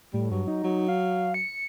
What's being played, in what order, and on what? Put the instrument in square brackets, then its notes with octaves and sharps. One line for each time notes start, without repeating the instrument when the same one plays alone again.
[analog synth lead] A2 [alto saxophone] G3
[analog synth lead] G2 [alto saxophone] F#3
[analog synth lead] D#4
[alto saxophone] F#3
[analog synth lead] F5
C#7